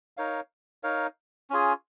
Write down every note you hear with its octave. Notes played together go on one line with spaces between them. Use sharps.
D#4 A#4 C#5 F5
D#4 A#4 C#5 F5
C#4 F4 G#4